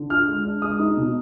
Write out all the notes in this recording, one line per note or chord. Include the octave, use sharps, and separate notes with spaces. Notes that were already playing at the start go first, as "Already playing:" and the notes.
Already playing: D3
F4 F6
G#3
D4
G#3 D#6
D#4
B2